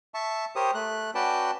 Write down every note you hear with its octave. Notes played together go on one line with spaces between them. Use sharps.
E5 A5 C#6
G4 A#4 C5 C#5 D#6
A3 F#6
C#4 F#4 B4 D5 G5 A5